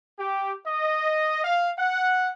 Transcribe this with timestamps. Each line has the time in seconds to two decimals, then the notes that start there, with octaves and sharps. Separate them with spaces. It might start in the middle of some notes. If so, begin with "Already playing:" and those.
0.18 G4
0.67 D#5
1.44 F5
1.78 F#5